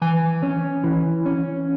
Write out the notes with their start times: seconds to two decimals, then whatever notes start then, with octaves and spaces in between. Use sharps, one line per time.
0.02 E3 G#5
0.43 C#4
0.84 E3
1.26 C#4